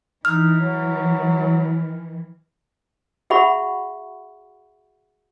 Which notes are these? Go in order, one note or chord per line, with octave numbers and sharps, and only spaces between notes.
E3 D#4 F6
F#3
F#4 G#4 E5 F#5 B5 C#6